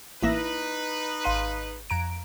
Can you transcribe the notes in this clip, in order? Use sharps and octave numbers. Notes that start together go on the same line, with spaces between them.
A1 A#3 D#4 E4 B4 E5 A#6
G#1 F5 C6 D#7
F2 A#5 D7